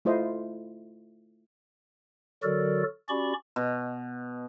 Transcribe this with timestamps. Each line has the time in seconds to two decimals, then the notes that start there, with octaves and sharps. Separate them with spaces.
0.05 A3 E4 F4 C5 D#5
2.43 D3 F#3 F#4 A4 A#4 D5
3.09 C#4 F#4 G4 D5 B5 C#6
3.56 B2